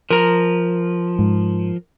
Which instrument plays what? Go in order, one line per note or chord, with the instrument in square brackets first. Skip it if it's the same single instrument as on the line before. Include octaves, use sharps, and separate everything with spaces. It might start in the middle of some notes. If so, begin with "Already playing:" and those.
[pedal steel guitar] F3 [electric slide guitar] A#4 A#5
[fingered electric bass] G#2